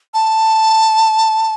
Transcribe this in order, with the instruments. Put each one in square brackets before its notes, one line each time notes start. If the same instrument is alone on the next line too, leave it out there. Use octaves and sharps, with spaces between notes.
[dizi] A5